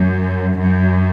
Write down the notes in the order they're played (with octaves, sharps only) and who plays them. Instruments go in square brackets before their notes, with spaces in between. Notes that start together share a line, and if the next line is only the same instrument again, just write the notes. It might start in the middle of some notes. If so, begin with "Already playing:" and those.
Already playing: [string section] F#2
F#2